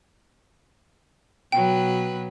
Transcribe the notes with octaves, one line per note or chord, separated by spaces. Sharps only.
B2 F#3 B4 G5